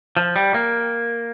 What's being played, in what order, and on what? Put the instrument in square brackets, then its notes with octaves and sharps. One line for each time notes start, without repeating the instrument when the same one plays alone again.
[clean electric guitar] F3
G3
A#3